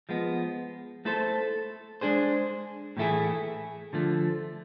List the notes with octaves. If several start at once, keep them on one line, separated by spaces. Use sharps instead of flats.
F3 G#3 B3
A3 E4 A4 C5
G#3 D4 G#4 C5
A2 E3 A3 E4 G#4
D3 F3 A3